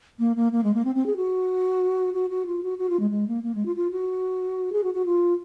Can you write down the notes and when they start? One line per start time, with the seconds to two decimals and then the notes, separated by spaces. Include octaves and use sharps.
0.19 A#3
0.36 A#3
0.52 A#3
0.63 G#3
0.74 A#3
0.85 C4
0.95 C4
1.06 G#4
1.16 F#4
2.14 F#4
2.30 F#4
2.46 F4
2.63 F#4
2.78 F#4
2.90 F4
3.00 G#3
3.10 G#3
3.28 A#3
3.43 A#3
3.55 G#3
3.65 F4
3.76 F4
3.91 F#4
4.72 G#4
4.83 F#4
4.94 F#4
5.06 F4